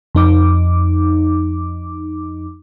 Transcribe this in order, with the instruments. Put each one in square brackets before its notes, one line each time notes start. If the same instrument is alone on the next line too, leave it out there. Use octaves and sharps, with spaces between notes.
[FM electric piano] F2 D#4 D6